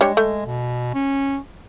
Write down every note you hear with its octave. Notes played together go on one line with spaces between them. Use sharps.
G3 G#3 D4 C#5
A3
B2
C#4